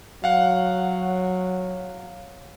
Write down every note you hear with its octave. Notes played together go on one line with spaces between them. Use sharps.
F#3 F5 F#5